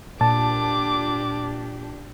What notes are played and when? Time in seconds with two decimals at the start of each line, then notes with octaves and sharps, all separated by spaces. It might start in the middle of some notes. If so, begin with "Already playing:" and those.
0.21 A#2 D4 G4 A5 D6